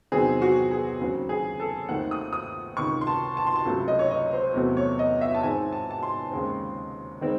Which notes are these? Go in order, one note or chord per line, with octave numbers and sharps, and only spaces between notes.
E2 C3 D#3 F#3 C4 G#4
F#4
G#4
D#2 C#3 F#3 C4
G#4
A4
D#2 D#3 A3 C4 F#5
D#6
D#6
C#2 C3 D#3 C#6
C6
A5
A5
C6
A5
C#2 C3 F#3 A3
D#5
C#5
D#5
C5
E2 C3 F#3 A3 C4
C#5
D#5
E5
A5
G#2 D#3 G#3 C4 G#5
A5
A5
C6
D#2 C#3 G#3 C4
D#3 G#3 C4